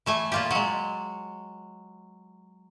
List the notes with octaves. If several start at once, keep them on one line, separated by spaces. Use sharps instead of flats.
E3 A3 G#5
A#2 F4 G4
F#3 G#3